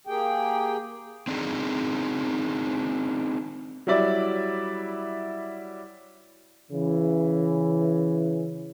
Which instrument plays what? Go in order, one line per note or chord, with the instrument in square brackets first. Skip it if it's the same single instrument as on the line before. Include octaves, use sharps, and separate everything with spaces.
[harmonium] A#3 G4 G#4 G5
[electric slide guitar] C4 D4 D#4 G#4
[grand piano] F#3 G3 E4 D5 E5
[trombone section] C#3 E3